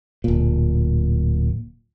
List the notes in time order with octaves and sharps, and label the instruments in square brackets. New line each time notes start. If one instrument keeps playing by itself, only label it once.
[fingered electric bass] D1 A#2